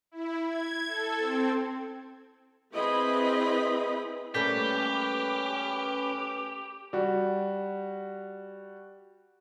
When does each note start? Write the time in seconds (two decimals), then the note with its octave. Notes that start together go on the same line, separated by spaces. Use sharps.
0.11 E4
0.46 G#6
0.87 A4
1.18 C4
2.73 C4 E4 G#4 B4 D#5 B5
4.34 G3 A3 A#3 C#4 G4 B4 G6 B6
6.93 G3 F#4